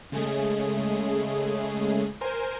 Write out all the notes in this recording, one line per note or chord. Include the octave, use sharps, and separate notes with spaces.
C#3 G#3 A3 G#4
A#4 C5 G#5